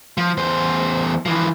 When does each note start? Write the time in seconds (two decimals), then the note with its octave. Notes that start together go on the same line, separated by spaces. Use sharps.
0.18 F3
0.38 E2 C5
1.26 E3 F3